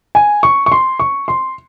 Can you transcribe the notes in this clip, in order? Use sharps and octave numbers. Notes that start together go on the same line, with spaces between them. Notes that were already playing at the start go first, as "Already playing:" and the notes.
G#5
C#6
C#6
C6
C#6
C6